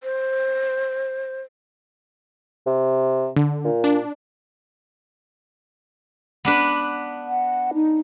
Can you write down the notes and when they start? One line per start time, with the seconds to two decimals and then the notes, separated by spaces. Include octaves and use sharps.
0.03 C5
2.67 C3
3.36 D3
3.64 A#2
3.84 D4
6.45 B3 D4 B4
7.26 F#5
7.74 D#4